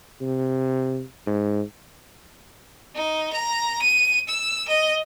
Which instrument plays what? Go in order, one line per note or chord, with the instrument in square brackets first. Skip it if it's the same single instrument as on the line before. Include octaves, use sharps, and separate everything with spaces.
[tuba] C3
G#2
[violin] D#4
A#5
D#7
E6
D#5